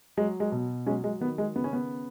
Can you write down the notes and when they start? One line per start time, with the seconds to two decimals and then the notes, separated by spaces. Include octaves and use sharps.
0.17 F#3 G#3
0.40 G#3
0.52 B2
0.86 F#3 G#3 C#4
1.04 G#3
1.21 D#3 B3
1.38 G#3
1.56 C#3 B3
1.64 C#4
1.73 B3